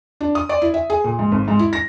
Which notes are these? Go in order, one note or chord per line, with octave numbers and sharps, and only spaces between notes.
D4
D#6
D5
E4
E5
G#4
A#2
G#2
G#1
G#2
E4
A#6